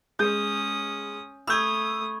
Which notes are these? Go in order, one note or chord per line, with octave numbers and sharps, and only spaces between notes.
G#3 C#4 D#6 G6
A3 B5 C#6 D#6 E6 G6 G#6